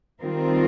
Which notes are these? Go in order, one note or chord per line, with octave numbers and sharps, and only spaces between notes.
D#3 G3 C4 F4 A#4